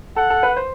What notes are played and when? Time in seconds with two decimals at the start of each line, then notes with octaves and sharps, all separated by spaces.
0.16 A4 F#5
0.30 A4
0.43 B4
0.57 C5